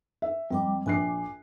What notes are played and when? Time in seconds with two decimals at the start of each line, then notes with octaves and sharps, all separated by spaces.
0.22 E5
0.50 F2 G3 G5 D6
0.86 A#1 G#5 D6 F#6 C7